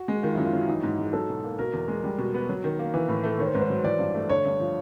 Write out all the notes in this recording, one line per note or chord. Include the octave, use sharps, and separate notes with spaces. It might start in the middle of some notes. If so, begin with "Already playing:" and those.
Already playing: F#4
G#3
D#3 F4
E4
F#2
F4
F#3
E3 D#4
G#2
G#3
F#3 A4
B2
A#3
B2 A#4
E2
G#3
G3
B2
B3
F#3
D#3
A#3
E3 B4
A2
A3
D#3 C#5
C5
G#2 B4
C5
F#3
E3 D5
G2
A3
D3 C#5
G2
F3